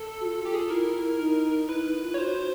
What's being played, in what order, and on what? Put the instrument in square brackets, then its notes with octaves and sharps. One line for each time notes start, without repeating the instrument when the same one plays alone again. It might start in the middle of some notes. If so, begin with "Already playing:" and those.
Already playing: [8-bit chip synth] A4
[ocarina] F#4
F4
[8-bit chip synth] G4
G#4
A4
[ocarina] E4 [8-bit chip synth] A#4
[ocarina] D#4
[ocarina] E4 [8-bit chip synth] B4
[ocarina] D#4
F4
[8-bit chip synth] C#5
[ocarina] F#4 [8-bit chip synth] C5